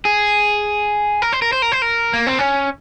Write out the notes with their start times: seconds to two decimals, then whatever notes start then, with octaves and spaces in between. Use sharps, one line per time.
0.05 G#4
1.22 A#4
1.33 C5
1.42 A#4
1.53 C5
1.62 A#4
1.72 C5
1.82 A#4
2.13 A#3
2.27 C4
2.39 C#4